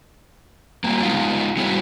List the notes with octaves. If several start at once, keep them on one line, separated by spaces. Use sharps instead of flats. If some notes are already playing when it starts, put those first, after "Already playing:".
F#3 G3 A#3
G#3 B3 D#4 F4
F#3 G3 B3 E4 F#4 G#4